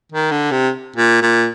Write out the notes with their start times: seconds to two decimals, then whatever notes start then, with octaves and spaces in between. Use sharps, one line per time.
0.12 D#3
0.31 D3
0.51 C3
0.96 A#2
1.22 A#2